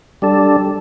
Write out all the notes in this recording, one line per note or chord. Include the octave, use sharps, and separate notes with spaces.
G3 D4 A4